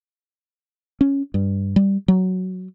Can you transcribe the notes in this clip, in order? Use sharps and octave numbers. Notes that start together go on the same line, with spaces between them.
C#4
G2
G3
F#3